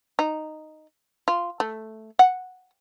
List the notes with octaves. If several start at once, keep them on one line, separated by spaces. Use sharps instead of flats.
D#4
F4
A3
F#5